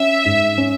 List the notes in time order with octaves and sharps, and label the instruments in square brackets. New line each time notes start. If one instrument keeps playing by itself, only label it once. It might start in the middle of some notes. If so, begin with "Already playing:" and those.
Already playing: [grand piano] C#4 [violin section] E5
[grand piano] G#2
C#4